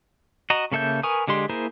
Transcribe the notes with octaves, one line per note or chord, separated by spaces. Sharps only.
F#4 D#5 A#5
C#3 A#3 A4 E5 G6
A#4 B4 G#5 C#6 D#6
D3 G#3 G4 C6
A#3 E4 G#4 A#4 C5